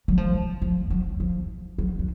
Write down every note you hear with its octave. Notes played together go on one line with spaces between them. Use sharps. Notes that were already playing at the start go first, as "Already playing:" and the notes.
F#3
F3
F3
F#3
F3
F#3
F#3